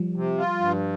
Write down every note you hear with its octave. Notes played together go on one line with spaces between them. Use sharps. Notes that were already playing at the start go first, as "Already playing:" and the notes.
Already playing: F3 G3
C3
F4
G2